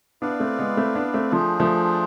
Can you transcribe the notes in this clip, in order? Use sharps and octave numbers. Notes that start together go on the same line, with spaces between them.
B3 D4 E4 B4 D5 F5
A3 C4
G#3 B3
A3 C4
B3 D4
A3 C4
F3 A3 D4 F4 G#4 C5
F3 A3